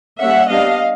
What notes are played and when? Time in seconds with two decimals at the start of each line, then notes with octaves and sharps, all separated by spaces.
0.21 G3 A#3 C#4 E5 F#5
0.49 G3 B3 D4 D#5 F5